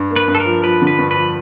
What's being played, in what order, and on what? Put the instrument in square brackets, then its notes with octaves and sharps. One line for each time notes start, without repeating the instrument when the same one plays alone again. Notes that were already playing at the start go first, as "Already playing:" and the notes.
Already playing: [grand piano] G2
A#3
[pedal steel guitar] B4
[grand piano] G2
[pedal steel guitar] A4
A#4
[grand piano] F3
[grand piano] F3 [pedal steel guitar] B4
[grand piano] D3
[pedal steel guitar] B4
[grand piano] G2
[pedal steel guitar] B4
[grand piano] F3